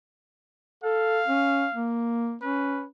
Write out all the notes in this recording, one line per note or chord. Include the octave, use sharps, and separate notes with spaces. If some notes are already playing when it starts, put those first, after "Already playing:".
A4 F5
C#4
A#3
C#4 B4